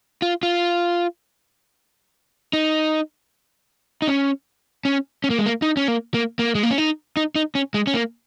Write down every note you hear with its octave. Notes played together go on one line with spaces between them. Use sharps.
F4
F4
D#4
D#4
C#4
C#4
C#4
A#3
G#3
A#3
D#4
C#4
A#3
A#3
A#3
G#3
A#3
C#4
D#4
D#4
D#4
C#4
G#3
C#4
A#3